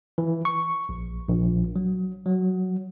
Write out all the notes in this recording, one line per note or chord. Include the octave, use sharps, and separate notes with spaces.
E3
C#6
A#1
A#1
F#3
F#3